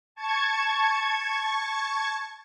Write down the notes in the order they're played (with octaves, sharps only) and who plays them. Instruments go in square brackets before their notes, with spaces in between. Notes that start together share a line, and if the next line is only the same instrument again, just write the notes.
[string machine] A5 C#6 G#6